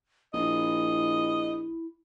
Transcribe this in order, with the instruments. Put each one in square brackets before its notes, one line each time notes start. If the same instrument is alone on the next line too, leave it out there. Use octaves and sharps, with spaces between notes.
[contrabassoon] A#1 [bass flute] E4 [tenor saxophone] D#5